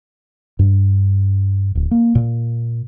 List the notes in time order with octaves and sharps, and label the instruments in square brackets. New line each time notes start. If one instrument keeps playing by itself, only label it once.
[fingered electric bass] G2
D1
A#3
A#2